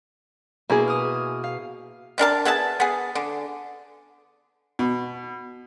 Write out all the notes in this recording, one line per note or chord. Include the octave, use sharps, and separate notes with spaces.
B2 A#3 E4 G#4
D#6 F6
F5
C3 D4 A#4 A5
B3 G#4 E5 A5
B3 G#4
D3
B2